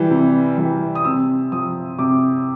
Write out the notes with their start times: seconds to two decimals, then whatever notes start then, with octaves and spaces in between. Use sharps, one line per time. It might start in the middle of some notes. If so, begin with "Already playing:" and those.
Already playing: E3 G3
0.10 C3
0.57 E3 G3
0.95 D#6
1.05 C3 E6
1.52 F3 D#6
1.99 C3 D6